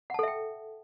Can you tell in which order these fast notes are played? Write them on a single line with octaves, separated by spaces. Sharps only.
F#5 A5 A4 E5 G5